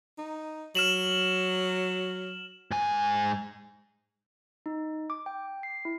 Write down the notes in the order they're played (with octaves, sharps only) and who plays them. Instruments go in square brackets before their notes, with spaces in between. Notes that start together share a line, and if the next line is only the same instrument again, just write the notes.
[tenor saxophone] D#4
[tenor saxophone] F#3 [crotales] F6 E7 F#7
[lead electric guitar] G#2 G#5
[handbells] D#4
D6
G5
C7
E4